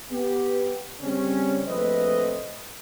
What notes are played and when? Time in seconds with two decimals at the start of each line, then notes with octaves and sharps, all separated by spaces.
0.12 B3 G4
1.00 C#3 G3 C4 C#4
1.67 A#1 F2 A3 C4 B4 D#5